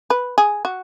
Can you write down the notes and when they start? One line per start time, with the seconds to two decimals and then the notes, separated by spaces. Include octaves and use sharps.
0.10 B4
0.38 G#4
0.65 F#4